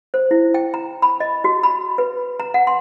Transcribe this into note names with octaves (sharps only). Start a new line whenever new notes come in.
C5
E4
G5
A#5
B5
D#5
F#4
B5
B4
A#5
F#5
C6